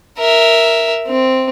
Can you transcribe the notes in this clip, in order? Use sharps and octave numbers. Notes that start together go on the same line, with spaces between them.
A#4 E5
C4